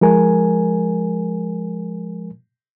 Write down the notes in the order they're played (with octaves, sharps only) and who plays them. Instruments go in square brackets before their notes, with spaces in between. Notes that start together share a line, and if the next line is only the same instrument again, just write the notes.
[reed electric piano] F3 G#3 A#4 G#5